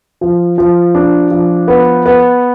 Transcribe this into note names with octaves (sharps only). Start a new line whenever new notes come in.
F3
F3
D4
F3
B3
B3